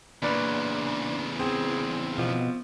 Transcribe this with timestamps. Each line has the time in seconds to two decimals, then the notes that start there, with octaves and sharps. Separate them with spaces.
0.22 E2 A#2 C#3 D4 B4 D5
1.39 C4 G#4
2.18 B2 F3